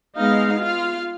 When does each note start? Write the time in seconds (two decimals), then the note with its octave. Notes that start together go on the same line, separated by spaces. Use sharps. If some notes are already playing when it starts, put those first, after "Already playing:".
0.17 G#3 B3 D#4 D#5 F5
0.60 F4 F5